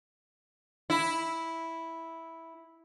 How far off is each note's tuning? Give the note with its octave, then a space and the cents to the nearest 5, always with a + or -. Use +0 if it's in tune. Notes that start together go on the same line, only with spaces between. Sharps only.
E4 -5